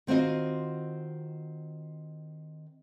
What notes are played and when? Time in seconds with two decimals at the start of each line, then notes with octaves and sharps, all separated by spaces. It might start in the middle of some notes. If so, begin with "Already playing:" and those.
0.07 D#3 C4 F4 F#4 D#5